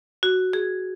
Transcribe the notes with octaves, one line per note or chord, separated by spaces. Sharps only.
F#4
G#4